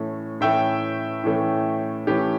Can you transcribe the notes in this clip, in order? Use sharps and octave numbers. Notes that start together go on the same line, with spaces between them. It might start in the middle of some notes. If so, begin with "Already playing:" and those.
Already playing: A2 E3 A3 C#4
A2 E3 A3 C#4 E5 G5
A2 E3 A3 C#4
A2 E3 A3 C#4 G4